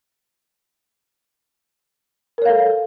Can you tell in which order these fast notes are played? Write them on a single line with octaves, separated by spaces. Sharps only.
A#4 C#5 F5 A4